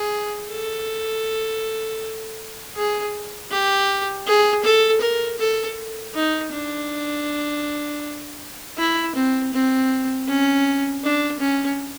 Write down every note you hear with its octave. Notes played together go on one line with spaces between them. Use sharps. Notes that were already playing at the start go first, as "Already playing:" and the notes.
Already playing: G#4
A4
G#4
G4
G#4
A4
A#4
A4
D#4
D4
E4
C4
C4
C#4
D4
C#4